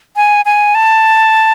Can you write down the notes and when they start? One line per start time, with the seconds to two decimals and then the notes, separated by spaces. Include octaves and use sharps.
0.16 G#5
0.45 G#5
0.75 A5